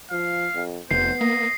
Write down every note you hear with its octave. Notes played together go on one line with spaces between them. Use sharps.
F3 F5
F2
F1 B3 C5 C7
A#3 D#5